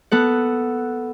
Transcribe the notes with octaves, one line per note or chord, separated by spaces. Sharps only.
B3 A4 F#5